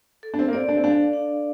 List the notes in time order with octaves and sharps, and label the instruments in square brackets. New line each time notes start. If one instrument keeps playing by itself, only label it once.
[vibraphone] A4
[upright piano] D4
C4
A#3
[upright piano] C4 [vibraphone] D5
[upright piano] D4
C4
[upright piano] D4 [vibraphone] F5
[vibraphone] D4